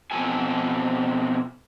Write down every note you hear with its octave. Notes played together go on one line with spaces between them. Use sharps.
B2 F3 C4 A4 G#5